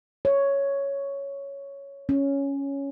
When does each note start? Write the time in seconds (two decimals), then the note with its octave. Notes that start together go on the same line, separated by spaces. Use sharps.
0.25 C#5
2.09 C#4